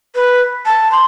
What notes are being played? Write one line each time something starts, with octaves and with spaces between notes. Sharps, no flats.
B4
A5
C6